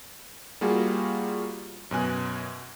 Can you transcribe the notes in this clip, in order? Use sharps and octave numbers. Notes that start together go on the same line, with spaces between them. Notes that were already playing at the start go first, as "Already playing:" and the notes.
G3 A#3 F4 F#4 G#4
F#2 B2 G#5 F#6